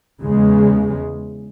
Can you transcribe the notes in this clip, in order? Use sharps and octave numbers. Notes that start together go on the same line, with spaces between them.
E2 C#3 G#3